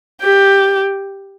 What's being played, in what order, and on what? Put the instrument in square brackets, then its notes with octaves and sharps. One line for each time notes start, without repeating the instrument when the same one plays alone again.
[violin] G4